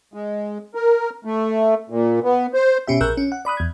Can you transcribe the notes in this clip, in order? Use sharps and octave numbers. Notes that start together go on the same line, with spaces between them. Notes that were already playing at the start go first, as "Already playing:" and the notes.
G#3
A#4
A3
A#2
B3
C5
B2 C#4 G4 E5
A#1 G#4 A#4 E6 F#6 G6
C#4
F#5
D5 B5 D#6 F#6
E2 G#6